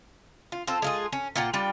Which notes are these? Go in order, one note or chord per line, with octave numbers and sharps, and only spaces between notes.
F4
C4 F4 A4 C5
G#3 F4 G#4
C#4
A#2 F4 F#5 G5
G3 D4 F4 G5